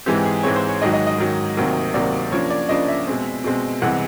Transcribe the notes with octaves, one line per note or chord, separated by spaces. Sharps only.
G#2 E3 G#3 C4 G4
G#4
G#2 E3 G#3 C4 C#5
C5
C#5
G#2 D#3 F#3 D#5
D#5
D#5
G#2 D#3 F#3
D2 C3 D#3 F#3 A#3
D2 C3 D#3 F#3 A#3 D5
C#3 F3 A#3 D4 C#5
D5
C#3 F3 A#3 D4 D#5
E5
B2 G#3 C4
B2 G#3 C4
C2 C3 E3 G#3 B3 F#5